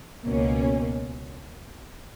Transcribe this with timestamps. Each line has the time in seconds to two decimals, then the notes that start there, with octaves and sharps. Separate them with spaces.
0.25 C#2 B2 A#3 C#4